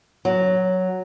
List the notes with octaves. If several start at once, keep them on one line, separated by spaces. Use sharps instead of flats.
F#3